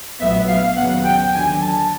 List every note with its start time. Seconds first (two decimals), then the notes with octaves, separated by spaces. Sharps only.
0.20 A#1 A2 F#3 B3 E5
0.48 F5
0.76 D#2 C#3 F#3 B3 F#5
1.04 G5
1.33 D#2 D3 F#3 G#5
1.61 A5